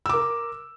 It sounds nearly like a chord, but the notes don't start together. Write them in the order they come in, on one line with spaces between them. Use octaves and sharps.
E6 D6 A#4